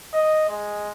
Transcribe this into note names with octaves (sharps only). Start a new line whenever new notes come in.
D#5
G#3